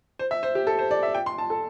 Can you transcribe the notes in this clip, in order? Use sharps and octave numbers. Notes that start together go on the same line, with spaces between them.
C5
E5
C5
G4
A4
C5
D5
E5
G5
C6
A5
A4